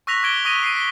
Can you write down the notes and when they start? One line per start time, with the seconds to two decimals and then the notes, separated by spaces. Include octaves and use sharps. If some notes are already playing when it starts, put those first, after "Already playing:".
0.07 C#6 E6 F#6 A#6 B6 F7
0.23 D6 G#6 D7 G7
0.45 C#6 D#6 A#6 B6 D#7
0.63 C7 D#7
0.76 B6 G7